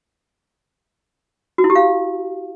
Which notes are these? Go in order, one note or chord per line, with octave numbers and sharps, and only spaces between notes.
F#4
E4
G4
F5